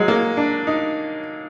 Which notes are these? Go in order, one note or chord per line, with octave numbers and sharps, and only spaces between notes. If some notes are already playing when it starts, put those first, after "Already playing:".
Already playing: F#3 G#3
A#3
D4
D#4